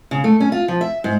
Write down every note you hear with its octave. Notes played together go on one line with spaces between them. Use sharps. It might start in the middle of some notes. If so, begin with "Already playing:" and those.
C#3
A3
C#4
F4
F3
E5
G#2